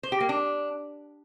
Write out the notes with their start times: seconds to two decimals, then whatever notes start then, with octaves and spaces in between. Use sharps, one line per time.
0.03 C5
0.12 G4
0.20 A#3
0.29 D4